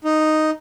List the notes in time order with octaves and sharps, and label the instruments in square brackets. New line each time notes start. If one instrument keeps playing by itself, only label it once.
[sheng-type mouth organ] D#4